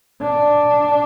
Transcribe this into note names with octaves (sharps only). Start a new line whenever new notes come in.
D4